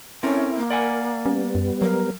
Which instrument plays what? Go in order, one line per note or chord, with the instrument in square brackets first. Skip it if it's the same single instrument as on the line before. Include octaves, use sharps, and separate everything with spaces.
[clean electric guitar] C4 A4 A#4 [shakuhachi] C#4 [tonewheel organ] E4
[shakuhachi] A#3
[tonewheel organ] A#4 [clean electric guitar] D5 F#5 G#5
[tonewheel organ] G3 B3 [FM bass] C#4
[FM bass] F#2
[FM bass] F#3 [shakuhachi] A#4